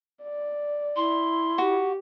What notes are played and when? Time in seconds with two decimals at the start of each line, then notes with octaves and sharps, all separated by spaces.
0.22 D5
0.96 E4 C6
1.58 F#4 G4